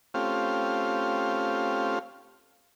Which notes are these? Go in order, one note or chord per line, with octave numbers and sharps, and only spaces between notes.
A3 C4 C#4 F4 G4 F5